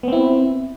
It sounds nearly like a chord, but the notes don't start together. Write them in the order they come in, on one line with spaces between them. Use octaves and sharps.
B3 C4 E4